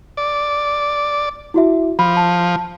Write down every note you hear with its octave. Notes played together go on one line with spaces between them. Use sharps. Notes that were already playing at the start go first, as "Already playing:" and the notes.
D5
E4 F#4 E5
F3 B5
A5